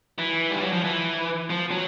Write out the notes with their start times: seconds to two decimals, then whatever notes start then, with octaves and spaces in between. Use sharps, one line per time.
0.19 E3
0.50 G3
0.62 F#3
0.73 F3
0.84 E3
1.50 F3
1.71 F#3